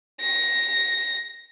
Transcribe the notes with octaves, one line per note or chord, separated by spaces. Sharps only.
A#6